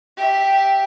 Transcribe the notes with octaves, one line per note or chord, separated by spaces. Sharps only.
G4 E5